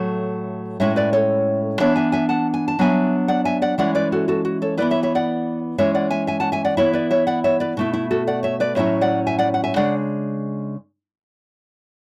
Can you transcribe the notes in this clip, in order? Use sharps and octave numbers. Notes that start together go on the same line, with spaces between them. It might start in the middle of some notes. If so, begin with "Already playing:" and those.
Already playing: A2 F#3 A3
A2 G#3 C#4 E4 C#5 E5
B4 D5
A4 C#5
E3 B3 D4 C#5 E5
E5 G#5
E5 G#5
F#5 A5
G#5
A5
F#3 B3 D4 E5 G#5
D5 F#5
E5 G#5
D5 F#5
E3 G#3 C#4 E4 D5 F#5
B4 D5
F#4 A4
F#4 A4
F#4
A4 C#5
E3 B3 E4 B4 D5
C#5 E5
C#5 E5
D5 F#5
E3 G#3 C#4 E4 C#5 E5
D5 F#5
E5 G#5
E5 G#5
F#5 A5
E5 G#5
D5 F#5
E3 B3 E4 C#5 E5
B4 D5
C#5 E5
D5 F#5
C#5 E5
B4 D5
B2 A3 E4
E4
F#4 A4
D5 F#5
C#5 E5
B4 D5
A2 F#3 C#4 E4 C#5 E5
D5 F#5
E5 G#5
D5 F#5
F#5
E5 G#5
C#3 G#3 D4 D5 F#5